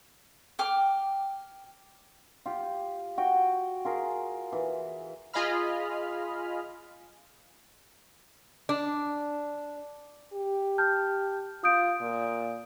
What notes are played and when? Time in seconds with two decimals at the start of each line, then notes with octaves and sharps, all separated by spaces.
0.59 G5 D6 F6
2.46 F4 G4
3.18 F#4 G5
3.85 F4 G#4 A#4
4.53 E3
5.33 F4 G#4 D#5 F5 B5 F6
8.69 D4
10.33 G4
10.78 A5 F6 G6
11.64 F4 D#6 G6 D7
12.02 A#2